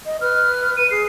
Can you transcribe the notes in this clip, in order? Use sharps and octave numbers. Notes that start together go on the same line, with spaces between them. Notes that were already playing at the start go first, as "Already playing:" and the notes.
D#5
B4 F6
D#7
G#4 C7